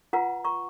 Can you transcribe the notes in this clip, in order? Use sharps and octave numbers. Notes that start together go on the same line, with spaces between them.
F4 B4 F#5 A#5
A#5 C#6